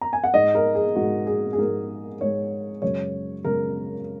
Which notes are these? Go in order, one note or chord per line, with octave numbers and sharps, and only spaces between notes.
A#5
G#5
F#5
G#2 G#3 D#5
A#4
G#4
G#2 G#3 F#4
G#4
G#4
G#2 G#3 A#4
G#2 G#3 C#5
F#2 C#3 G#3 C#5
F#2 C#3 G#3 A#4